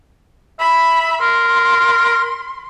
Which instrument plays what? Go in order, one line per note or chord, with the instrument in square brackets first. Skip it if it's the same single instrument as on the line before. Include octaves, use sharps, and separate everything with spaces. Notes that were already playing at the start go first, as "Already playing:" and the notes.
[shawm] E5 [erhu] B5
[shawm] A#4 [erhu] C6